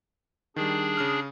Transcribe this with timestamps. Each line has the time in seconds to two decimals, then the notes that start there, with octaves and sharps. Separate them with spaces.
0.56 D#3 G3 D4 G#4
0.97 C#3 D#6 F6